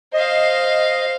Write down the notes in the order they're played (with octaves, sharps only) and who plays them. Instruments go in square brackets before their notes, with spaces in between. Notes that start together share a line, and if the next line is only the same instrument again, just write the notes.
[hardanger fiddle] C5 F5 [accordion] D#5